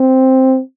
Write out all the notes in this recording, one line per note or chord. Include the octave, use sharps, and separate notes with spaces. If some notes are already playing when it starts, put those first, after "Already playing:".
Already playing: C4